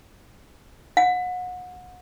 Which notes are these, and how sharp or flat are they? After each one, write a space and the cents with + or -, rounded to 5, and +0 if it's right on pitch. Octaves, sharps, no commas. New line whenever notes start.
F#5 -30